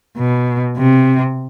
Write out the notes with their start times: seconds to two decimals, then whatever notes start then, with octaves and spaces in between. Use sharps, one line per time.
0.18 B2
0.78 C3